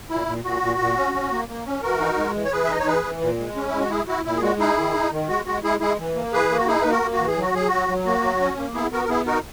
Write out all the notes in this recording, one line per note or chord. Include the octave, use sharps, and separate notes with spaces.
A#2 E4
A#2
A#2 F#4
A#2
A#2
C#4
C#4
A#3
A#3
C#4
E3 F#4 A#4
D#4
G#3
E3
C#5
E3 G#4 B4
E5
D#4 D#5
C#5
E3 G#4 B4
E3
A#2
G#3
C#4
G#3 E4
F#4
E4 G#4
E4 F#4
A#2 E4
G#4
G#3 F#4
D#4 E4 G#4
D#3
D#4
D#3
G#3 F#4
G#3 F#4
G#3 E4 G#4
G#3 E4 G#4
E3
A#3
E3 G#4 B4
A#3
F#4
D#4 E4 G#4
A#3 B4
F#4 A#4
A#3
F#4
E3
G#4
F#3 F#4
F#3 G#4
F#3 F#4
F#3
A#3 F#4
F#3
C#4
A#3
B3 E4 G#4
B3 F#4 A#4
A#4
B3 E4 G#4
D#4 F#4 A#4